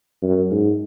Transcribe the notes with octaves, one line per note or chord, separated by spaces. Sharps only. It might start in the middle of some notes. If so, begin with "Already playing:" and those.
F#2
G#2